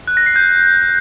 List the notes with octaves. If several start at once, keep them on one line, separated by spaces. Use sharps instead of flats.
F#6
A#6
C7
G6